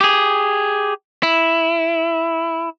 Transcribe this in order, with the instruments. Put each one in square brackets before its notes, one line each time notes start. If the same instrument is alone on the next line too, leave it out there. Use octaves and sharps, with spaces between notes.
[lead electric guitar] G4 G#4
E4